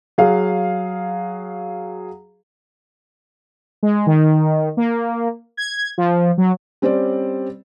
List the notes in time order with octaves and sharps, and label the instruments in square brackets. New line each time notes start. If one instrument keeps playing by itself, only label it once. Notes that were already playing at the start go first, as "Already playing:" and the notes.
[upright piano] F#3 G#4 F5
[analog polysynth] G#3
D#3
A#3
G#6
F3
F#3
[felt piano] G3 C4 C#4 C5 D5